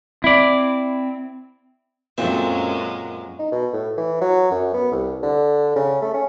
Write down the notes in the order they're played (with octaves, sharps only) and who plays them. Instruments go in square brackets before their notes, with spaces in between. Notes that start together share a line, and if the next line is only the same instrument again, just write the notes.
[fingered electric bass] C4 [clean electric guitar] E4 D5
[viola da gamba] F#2 F#3 G#3 [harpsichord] A#2 E5 [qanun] C4 F#4 A4
[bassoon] D#4
B2
A2
E3
F#3
F#2
B3
C2
D3
C#3
A3
C#4